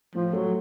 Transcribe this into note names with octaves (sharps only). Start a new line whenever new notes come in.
A2 F3
F#3 A3